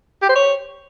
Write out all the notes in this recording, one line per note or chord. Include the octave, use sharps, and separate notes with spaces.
G4
C5
C#5